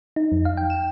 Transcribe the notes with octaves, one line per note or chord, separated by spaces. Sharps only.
D#4
F2
F5
G5
E7